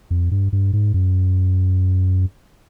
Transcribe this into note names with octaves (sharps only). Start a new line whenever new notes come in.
F2
G2
G2
G#2
F#2